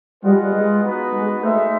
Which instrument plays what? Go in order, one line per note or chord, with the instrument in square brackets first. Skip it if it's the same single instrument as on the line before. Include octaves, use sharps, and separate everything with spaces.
[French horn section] G3 [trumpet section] F4 G#4 B4 D#5 F#5
[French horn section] G#3
[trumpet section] B3 D#4 F#4 B4 D#5
[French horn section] G#3
[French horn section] A3 [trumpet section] D#4 G#4 C5 E5